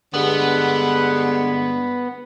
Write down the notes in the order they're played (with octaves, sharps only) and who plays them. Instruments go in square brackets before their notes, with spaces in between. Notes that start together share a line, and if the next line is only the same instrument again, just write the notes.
[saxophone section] G2 D3 G#3 [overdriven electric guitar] B3